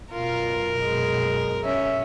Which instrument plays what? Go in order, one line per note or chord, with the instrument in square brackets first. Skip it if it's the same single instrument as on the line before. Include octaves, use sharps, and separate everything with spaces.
[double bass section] F#2 B2 [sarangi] F4 [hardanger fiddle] A#4
[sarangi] G#3
[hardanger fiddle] C#4 [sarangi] E5